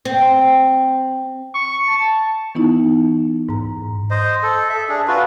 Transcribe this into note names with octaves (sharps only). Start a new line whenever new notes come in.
C4
C#6
A5
E3 B3 D#4 E4
G#2 A#5
C5 D#5
A4
E5
D4 G#4
F4 F#4 B4